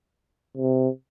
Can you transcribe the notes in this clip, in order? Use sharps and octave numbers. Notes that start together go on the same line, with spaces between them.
C3